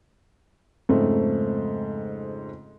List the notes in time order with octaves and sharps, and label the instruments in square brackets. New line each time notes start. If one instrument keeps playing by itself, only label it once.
[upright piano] F2 G#2 C#3 A3 C4